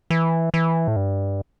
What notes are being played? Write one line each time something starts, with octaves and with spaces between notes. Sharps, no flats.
E3
E3
A2
G2